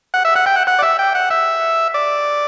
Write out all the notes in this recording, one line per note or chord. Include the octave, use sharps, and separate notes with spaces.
F#5
E5
F#5
G5
F#5
F#5
D5
E5
G5
F#5
E5
D5